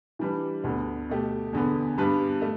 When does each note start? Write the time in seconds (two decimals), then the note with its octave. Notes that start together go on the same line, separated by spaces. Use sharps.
0.19 E3 G3 D4 B4
0.64 D2 D3 B3
1.09 B2 A3 G4
1.53 E2 D3 B3
1.98 G2 G3 B3 D4 B4
2.42 A3